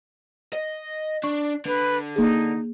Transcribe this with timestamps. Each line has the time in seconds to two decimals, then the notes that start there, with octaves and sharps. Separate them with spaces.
0.53 D#5
1.24 D4 C#6
1.66 D3 B4
2.16 A#3 D#4 G#4